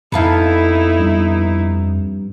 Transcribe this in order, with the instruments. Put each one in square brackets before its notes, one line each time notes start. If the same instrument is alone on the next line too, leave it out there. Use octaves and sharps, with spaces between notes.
[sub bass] F2 [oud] B3 A4 F5 [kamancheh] D#4 E4
[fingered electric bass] G2